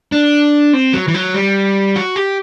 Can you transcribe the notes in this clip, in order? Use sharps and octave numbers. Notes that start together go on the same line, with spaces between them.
D4
C4
F#3
E3
F#3
G3
F#4
G4